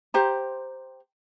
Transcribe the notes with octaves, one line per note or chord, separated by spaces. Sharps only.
G4 C5 A#5